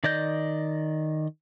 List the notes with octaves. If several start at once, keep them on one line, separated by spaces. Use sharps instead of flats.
D#3 D5 D#5 G6